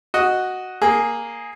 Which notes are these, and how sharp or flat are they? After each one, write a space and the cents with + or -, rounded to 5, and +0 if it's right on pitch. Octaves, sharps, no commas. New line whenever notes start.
F#4 +0 D#5 +0
A#3 +0 G#4 +0